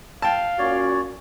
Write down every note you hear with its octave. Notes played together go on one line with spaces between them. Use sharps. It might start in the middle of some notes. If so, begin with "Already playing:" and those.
F5 G5 A5
A#2 C#4 F#4 C#5 D5